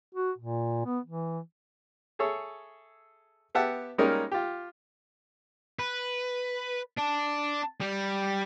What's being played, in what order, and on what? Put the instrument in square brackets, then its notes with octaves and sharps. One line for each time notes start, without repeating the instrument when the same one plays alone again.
[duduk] F#4
A#2
B3
E3
[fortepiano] G#4 A4 C#5 E5
B3 G4 E5 F#5 A5
G3 G#3 A#3 C#4 D#4 A#4
F4 G4
[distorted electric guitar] B4
D4
G3